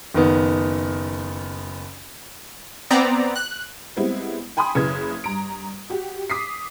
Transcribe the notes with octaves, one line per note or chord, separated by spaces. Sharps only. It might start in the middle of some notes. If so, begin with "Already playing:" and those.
F#1 D#3 B3
B3 C4 D5 A#5
F#6
G3 G#3 B3 C4 E4
G5 G#5 B5 C6 D#6
F#1 C#3 E4 B4 G#6
G2 A#5 D7
F#4 G4
D6 D#6 B6 C7